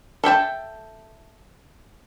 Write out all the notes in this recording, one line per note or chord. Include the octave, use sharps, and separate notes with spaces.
A4 E5 G5 A5